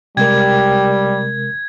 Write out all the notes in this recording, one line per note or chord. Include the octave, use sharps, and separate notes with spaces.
C3 G3 G#3 G4 A#4 G#6